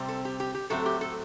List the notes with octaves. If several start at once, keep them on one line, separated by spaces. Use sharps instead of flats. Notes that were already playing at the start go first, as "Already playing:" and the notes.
Already playing: C3 G3 C4
A4
G4
G4
G4
A2 F#3 A3 C4 A4
G4
A4